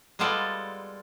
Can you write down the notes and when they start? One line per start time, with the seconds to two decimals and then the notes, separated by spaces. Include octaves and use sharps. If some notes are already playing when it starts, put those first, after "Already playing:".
0.19 G3 G#3 B3 F4 A4 D5